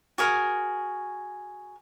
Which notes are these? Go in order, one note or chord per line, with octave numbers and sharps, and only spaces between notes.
F#4 G#4 A#4